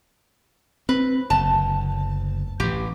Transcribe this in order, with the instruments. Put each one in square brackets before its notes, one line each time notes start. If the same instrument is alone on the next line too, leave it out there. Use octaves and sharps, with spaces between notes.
[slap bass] C4 [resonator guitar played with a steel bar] B4
[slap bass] F#1 D2 [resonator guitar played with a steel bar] A5
[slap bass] A1 E3 [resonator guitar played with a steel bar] G4